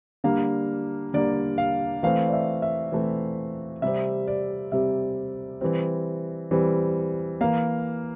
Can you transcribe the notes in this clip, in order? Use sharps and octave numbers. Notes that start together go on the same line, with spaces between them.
D3 G3 A#3 F5
D3 G3 A#3 D5
F5
E3 A3 C4 F5
D5
E5
E5
E3 A3 C4
C3 G3 C4 E5
D5
C3 G3 C4 E5
E3 G3 C4
E3 G3 C4
E3 A#3 F5